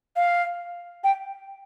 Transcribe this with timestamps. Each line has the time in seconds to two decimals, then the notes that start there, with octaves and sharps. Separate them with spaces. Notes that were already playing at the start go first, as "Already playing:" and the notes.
0.16 F5
1.04 G5